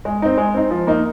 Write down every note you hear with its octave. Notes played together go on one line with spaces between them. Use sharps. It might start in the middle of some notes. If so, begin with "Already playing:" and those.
G#3
C4 D#4
G#3
C4 D#4
F3
A#3 D#4